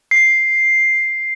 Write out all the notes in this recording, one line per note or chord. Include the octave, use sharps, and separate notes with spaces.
C7